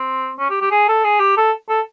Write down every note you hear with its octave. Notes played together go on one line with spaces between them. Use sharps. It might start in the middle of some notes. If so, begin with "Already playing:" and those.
Already playing: C4
C#4
G4
G4
G#4
A4
G#4
G4
A4
A4